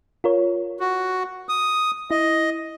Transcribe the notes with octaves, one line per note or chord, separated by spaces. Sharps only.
F4 A#4 C#5
F#4
D#6
E4 D#5